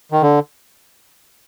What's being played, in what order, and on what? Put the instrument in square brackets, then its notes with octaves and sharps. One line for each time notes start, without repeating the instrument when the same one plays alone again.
[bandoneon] D#3
D3